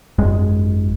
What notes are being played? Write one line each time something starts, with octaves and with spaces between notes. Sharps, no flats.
G#1 F#2 G#3